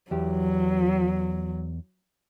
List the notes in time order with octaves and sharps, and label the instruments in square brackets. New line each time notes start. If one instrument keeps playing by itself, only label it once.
[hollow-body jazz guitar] E2 G4 [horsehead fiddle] F#3